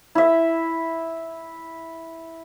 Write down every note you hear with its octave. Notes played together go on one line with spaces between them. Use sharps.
E4 E5